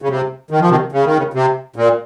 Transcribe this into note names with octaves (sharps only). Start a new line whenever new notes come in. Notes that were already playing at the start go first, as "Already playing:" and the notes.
C#3
C3
D#3
F3
C3 D#3
C#3
D#3
C#3
C3
A#2